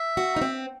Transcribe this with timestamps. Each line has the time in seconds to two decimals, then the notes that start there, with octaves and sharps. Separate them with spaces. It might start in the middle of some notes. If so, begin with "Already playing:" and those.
Already playing: E5
0.17 F#4
0.36 D#4
0.41 C4